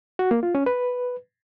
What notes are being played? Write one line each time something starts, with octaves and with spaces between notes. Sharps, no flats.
F#4
A#3
F4
C#4
B4